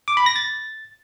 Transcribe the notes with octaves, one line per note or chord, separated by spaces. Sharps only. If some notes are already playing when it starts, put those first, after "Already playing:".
D6
B5
A#6
A6